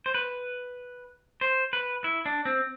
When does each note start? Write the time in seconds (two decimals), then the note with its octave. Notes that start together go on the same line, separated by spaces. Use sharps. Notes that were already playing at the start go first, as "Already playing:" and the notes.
0.06 C5
0.14 B4
1.41 C5
1.73 B4
2.04 E4
2.26 D4
2.45 C4